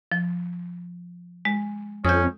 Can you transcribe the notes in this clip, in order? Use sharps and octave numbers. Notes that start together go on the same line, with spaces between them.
F3
G#3
F2 C#4 D#6 G6